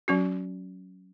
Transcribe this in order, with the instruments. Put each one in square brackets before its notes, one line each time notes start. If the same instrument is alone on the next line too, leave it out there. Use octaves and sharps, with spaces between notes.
[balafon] F#3 C#4 F#4